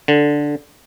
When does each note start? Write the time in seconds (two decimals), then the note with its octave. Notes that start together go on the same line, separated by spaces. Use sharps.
0.08 D3